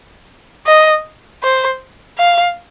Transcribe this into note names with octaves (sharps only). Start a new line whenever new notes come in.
D#5
C5
F5